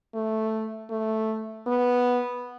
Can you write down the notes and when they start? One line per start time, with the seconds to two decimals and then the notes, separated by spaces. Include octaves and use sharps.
0.15 A3
0.90 A3
1.67 B3